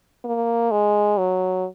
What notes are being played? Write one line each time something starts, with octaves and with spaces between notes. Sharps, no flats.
A#3
G#3
F#3